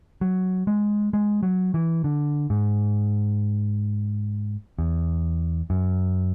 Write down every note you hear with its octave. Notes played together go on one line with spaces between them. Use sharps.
F#3
G#3
G#3
F#3
E3
D3
G#2
E2
F#2